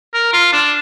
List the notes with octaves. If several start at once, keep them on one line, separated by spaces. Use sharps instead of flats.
A#4
F4
D4